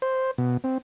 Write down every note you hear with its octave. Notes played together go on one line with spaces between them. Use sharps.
C5
B2
C4